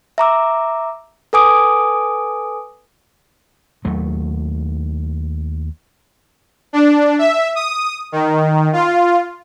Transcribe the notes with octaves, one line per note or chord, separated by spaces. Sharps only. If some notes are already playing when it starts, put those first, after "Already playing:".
E5 A#5 D6 E6
A4 B4 G#5 D6 D#6 D7
D#2 F#3 A3
D4
E5
D#6
D#3
F4